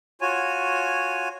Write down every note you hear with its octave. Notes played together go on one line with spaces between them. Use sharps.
F4 F#4 C#5 G#5